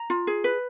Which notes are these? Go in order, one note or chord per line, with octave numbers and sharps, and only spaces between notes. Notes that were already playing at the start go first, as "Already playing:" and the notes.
Already playing: A#5
F4
G#4
B4